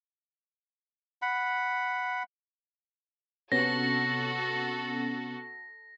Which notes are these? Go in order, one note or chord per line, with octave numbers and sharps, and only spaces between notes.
F#5 B5
C3 B3 C#4 F#4 A4 A#6